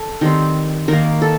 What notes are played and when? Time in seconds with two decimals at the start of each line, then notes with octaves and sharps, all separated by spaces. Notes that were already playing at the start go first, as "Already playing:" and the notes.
Already playing: A4
0.21 D#3 G3 C4
0.88 D#3 A#3 A#4
1.22 A4